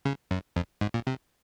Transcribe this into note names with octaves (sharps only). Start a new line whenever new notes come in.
C#3
F#2
F2
G#2
A#2
C3